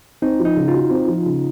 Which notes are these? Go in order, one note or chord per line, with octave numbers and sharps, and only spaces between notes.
C4 D#4
F3
D#4
C#3
F4
F#4
C4
F3
C#3